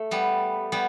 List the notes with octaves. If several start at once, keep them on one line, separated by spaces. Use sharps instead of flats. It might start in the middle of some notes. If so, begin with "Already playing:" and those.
Already playing: A3
G3 B3
G3 B3